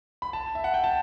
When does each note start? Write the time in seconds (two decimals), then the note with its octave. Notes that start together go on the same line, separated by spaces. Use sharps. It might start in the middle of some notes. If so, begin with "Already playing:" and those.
0.22 B5
0.33 A5
0.55 E5
0.64 F#5
0.74 G5
0.84 A5